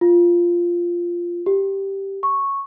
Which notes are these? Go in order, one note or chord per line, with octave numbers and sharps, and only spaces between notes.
F4
G4
C#6